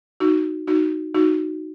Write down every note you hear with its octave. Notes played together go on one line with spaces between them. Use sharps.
D#4 F#4
D#4 F#4
D#4 F#4